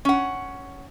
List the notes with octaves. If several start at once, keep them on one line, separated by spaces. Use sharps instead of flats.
C#4 F#5